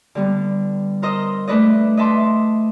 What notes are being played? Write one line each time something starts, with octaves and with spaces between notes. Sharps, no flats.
D3 G3 B3
A#4 C5 D#5 D#6 E6
A3 D4 A4 B4 D5 D#5
D#5 E5 A5 C6 D6